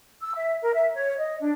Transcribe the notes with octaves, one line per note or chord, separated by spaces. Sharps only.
E6
E5
A#4
E5
C#5
D#5
D4